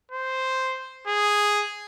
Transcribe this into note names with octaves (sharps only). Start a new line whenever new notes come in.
C5
G#4